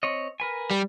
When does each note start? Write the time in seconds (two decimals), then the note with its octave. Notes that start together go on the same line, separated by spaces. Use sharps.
0.03 C4 C#5 D#5
0.40 A#4 B4 G#5
0.71 G3